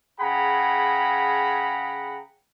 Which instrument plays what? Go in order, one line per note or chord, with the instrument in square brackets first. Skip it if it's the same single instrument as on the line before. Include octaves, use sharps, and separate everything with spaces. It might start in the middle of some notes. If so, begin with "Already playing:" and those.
[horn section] C#3 G#4 F#5 G5 A#5 B5